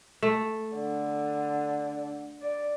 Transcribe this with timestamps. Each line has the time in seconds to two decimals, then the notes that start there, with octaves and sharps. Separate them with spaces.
0.22 A3
0.76 D3
2.42 D5